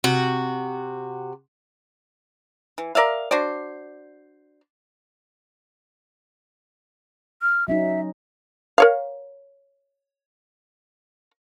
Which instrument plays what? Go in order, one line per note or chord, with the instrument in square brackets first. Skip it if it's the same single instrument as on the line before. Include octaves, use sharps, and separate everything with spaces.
[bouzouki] C3 F#4
[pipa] E3
A#4 D5 E5 F5
D4 F#4 C5 D5
[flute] F6
[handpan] F#3 C#4 D#4 [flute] E5
[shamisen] A#4 C#5 F5